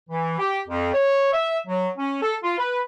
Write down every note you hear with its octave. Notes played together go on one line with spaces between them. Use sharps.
E3
G4
F2
C#5
E5
F#3
C#4
A4
F4
B4